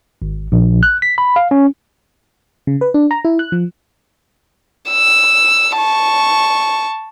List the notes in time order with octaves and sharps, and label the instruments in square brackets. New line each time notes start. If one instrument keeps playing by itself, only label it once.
[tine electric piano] G#1
A#1
F#6
B6
B5
F5
C#4
[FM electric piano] C#3
B4
D4
A#5
E4
F#6
F3
[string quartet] E6
A5 C#6